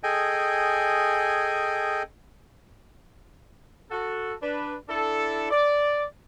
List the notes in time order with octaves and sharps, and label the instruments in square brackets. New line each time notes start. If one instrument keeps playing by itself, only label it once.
[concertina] G#4 A4 D#5 G5 G#5
[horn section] F#4 A4
D4 B4
D4 E4 A4
D5